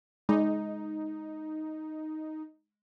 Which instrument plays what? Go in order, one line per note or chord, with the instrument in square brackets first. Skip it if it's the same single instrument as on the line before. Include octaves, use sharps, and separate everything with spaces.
[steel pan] G#3 [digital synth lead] D#4